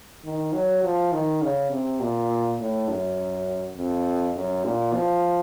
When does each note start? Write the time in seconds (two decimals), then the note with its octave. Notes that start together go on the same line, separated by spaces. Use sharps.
0.25 D#3
0.53 F#3
0.84 F3
1.13 D#3
1.42 C#3
1.71 C3
2.01 A#2
2.60 A2
2.89 F#2
3.77 F2
4.36 F#2
4.65 A#2
4.94 F3